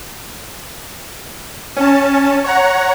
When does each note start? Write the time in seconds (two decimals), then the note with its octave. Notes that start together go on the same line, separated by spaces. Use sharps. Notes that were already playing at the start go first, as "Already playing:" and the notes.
1.76 C#4 A5
2.44 C#5 F#5 A#5